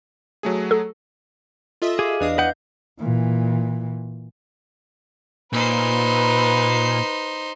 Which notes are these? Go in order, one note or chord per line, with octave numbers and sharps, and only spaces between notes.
F#3 A3 G#4
A4
F4 A4 D#5 E5
G4 G#4 F5 D6
E2 D4 B4 D#5 F5 D#6
B4 F#5 G6
A#2 E3
A#2 D#4 B4 C5